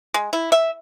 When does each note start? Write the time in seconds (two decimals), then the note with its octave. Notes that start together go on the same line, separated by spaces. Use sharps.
0.14 G#3
0.33 E4
0.52 E5